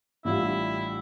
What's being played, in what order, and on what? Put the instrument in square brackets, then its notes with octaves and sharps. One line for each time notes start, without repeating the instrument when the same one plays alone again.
[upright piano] A1 A2 G3 D4 F4 [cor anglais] E4